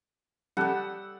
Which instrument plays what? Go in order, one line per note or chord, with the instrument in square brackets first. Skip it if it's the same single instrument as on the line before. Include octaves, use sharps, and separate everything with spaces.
[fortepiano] G3 A4 [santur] F#5 E6